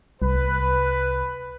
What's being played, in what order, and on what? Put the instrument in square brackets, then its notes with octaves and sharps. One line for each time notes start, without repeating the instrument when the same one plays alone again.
[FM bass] C2 [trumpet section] B4